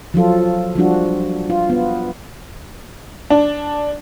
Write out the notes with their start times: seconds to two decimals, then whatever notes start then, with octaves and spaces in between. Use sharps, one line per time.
0.14 F3 F#3 F4 A4
0.75 F3 G3 D4 F#4
1.50 F4
1.70 B3
3.30 D4